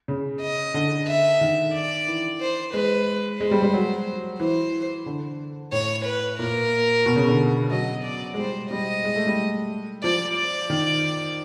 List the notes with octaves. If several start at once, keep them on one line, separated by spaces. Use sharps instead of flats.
C#3
D#5
D3
E5
D#3
D5
E3
C5
G#3 B4
G#3 C5
G3
G3
F#3
E3 C5
D3
A2 C#5
B4
A#2 A#4
B2
C#3
D3
F#3 D#5
D5
G#3
G3 C5
G3 D#5
G#3
A3
G3
F3 D5
D5
D#3